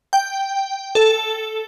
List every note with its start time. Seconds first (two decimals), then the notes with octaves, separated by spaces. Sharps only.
0.13 G5
0.95 A4